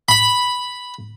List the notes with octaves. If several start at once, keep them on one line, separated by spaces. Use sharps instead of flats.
B5